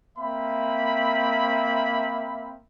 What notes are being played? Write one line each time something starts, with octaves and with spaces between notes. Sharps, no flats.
A#3 C4 E5 B5